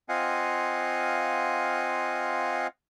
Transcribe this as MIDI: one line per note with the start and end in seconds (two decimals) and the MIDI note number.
0.09 2.67 60
0.09 2.67 65
0.09 2.67 75
0.09 2.67 77
0.09 2.67 78
0.09 2.67 80